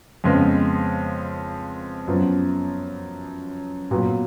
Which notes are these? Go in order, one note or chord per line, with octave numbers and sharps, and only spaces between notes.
F2 C#3 G#3 B3
F#2 F3 B3
A#2 F#3 B3